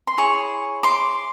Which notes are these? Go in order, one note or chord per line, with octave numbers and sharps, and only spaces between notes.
C6
E4 G#4 C#5 C#6
C6 D6